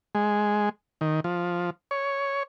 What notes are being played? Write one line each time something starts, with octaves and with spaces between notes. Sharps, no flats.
G#3
D#3
F3
C#5